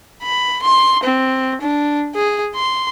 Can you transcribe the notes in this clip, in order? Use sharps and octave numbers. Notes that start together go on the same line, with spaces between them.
B5
C6
C4
D4
G#4
C6